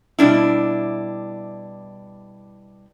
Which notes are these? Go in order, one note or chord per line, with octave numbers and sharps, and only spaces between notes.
B2 G3 D4 E4